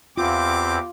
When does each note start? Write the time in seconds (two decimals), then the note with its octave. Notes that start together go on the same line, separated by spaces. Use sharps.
0.17 E2 C4 F4 G4 D6